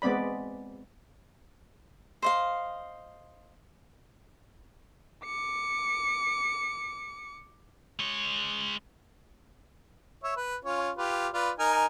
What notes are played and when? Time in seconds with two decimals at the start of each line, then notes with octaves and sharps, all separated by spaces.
0.02 G#3 B3 C4 D5 B5
2.22 C5 D#5 F5
5.25 D6 C#7
7.99 G#3 C#5
10.24 C#5 E5
10.37 B4
10.65 C#4 F4 C#5
10.97 F4 G4 B4
11.33 F4 B4 D5
11.59 D#4 A#4 G#5